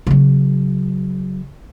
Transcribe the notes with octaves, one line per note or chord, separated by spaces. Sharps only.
C#3 F#3